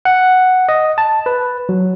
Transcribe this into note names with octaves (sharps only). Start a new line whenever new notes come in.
F#5
D#5
A5
B4
F#3